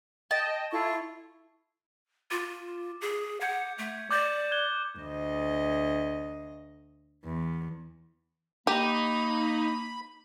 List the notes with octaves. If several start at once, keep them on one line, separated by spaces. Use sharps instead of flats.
D#5 G5 A5
E4 F4 A4 C#6
F4 D6
G#4
F#5 G6 G#6 C#7
A3
D5 D6 G6
F#6 G#6 G7
D2 D#5
E2
A#3 D#4 G4 B5